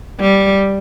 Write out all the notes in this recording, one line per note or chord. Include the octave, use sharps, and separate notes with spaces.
G3